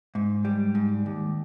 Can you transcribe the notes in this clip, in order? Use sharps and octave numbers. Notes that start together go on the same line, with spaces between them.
G#2
G3
G#2
D#2